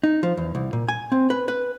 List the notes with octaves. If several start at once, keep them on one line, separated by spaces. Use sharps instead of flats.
D#4
F3
E2
C2
A#2
G#5
C4
B4
B4